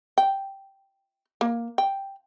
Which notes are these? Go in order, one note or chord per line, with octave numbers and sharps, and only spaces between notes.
G5
A#3
G5